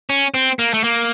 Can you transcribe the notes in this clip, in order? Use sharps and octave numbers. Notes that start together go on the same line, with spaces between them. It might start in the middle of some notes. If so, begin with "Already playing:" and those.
C#4
C4
A#3
A3
A#3